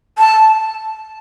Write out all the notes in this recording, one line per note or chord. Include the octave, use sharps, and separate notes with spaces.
A5